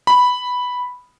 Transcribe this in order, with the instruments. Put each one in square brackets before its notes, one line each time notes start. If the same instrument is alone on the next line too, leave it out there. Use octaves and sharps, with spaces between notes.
[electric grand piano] B5